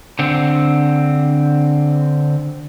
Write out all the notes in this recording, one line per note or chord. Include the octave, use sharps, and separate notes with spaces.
D3 C4